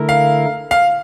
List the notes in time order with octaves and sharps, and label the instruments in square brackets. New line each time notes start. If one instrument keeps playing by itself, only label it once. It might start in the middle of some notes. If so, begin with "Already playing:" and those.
Already playing: [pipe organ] D3 A3 E4 A#4
[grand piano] F5
F5